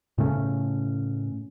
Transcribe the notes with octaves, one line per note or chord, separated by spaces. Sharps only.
A2 C#3 A3 C#4